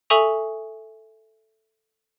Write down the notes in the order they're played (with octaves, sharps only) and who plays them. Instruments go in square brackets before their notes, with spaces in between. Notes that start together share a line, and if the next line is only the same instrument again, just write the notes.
[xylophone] A4 E5 G#5 C#6 D#6 F7